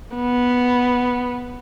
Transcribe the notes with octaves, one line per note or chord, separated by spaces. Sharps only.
B3